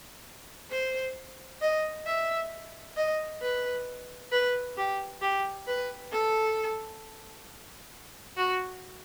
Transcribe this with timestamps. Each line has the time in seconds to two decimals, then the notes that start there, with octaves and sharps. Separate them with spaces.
0.71 C5
1.61 D#5
2.06 E5
2.96 D#5
3.42 B4
4.32 B4
4.77 G4
5.21 G4
5.67 B4
6.12 A4
8.37 F#4